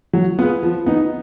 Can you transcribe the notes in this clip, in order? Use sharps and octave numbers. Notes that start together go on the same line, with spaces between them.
F#3
B3 F4 G#4 B4
F3
B3 D#4